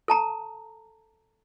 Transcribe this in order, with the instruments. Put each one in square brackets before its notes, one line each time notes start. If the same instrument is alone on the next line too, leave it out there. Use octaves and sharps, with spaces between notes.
[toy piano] A4 A5 A#5